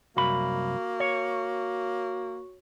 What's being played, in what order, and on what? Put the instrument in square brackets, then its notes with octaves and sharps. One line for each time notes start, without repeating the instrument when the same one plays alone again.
[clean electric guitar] C2 F#2 B5 [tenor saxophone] A#3 [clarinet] F#4
[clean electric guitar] C#5